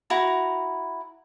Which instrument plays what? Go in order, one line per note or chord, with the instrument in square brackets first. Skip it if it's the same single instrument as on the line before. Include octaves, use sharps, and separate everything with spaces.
[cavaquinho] E4 F#4 A#5